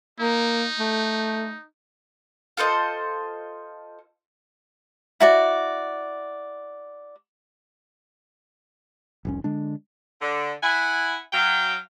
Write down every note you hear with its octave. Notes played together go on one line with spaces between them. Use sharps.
A#3 D#4
A3
F4 A4 C5 D#5
E4 F#4 D5
F1 C2 C#4
D3 G#3 D4
D3
E4 F#5 G#5
F#3 F5 G5